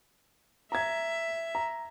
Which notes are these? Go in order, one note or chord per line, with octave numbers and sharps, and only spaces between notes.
E5 A#5 G#6
A#5